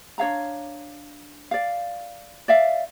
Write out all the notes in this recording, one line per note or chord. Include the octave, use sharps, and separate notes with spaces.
D4 C#5 F5 A#5
D5 F5
D5 E5 F5